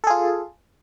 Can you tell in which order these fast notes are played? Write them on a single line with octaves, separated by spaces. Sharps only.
A4 G#4 F4